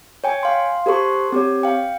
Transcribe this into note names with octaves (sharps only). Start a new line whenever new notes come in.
C#5 G5 G#5
F5 C6
G4 A4 C5 C6 C#6
C4 G4 C#5
F5 G5